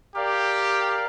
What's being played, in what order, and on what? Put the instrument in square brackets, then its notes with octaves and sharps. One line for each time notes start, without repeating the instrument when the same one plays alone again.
[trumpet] G4 [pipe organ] A#4 D5 F5